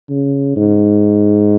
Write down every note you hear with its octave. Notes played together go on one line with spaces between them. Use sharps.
C#3
G#2